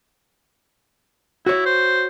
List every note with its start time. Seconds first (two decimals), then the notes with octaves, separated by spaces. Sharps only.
1.46 E4 F#4 C#5
1.66 C5